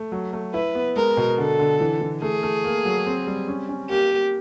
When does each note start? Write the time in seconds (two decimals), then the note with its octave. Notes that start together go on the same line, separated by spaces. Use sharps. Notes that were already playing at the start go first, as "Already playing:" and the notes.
Already playing: A3
0.12 F#3
0.33 A3
0.54 E4 B4
0.75 B3
0.96 G#3 A#4
1.17 B2
1.38 D3 A4
1.59 D3
1.80 E3
2.01 E3
2.22 A3 G#4
2.43 A3
2.64 A#3
2.85 F#3
3.06 C4
3.27 G3
3.48 C#4
3.69 C#4
3.90 A#3 G4
4.11 A#3